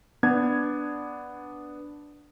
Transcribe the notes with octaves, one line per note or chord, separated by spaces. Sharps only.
B3 D4 G#6